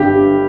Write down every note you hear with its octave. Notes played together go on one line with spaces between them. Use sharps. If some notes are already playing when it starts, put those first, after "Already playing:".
Already playing: G1 G2 D3 G4